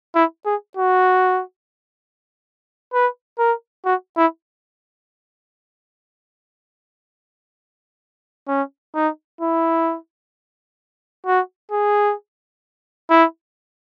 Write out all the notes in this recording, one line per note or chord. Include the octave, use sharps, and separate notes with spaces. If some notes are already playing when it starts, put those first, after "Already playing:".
E4
G#4
F#4
B4
A#4
F#4
E4
C#4
D#4
E4
F#4
G#4
E4